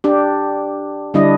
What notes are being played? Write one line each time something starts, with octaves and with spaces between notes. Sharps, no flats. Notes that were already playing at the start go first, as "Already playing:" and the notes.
D4 G4
D3 G3 D4 E4 D#5